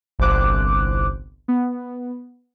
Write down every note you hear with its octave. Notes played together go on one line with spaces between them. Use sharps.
G1 C2 C5 D6 F#6
B3